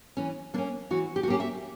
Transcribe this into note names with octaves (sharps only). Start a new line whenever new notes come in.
E3 C#4
A#3 C#4 D4
E3 F#4
G4
F#4
A#3 C#4 G4
E5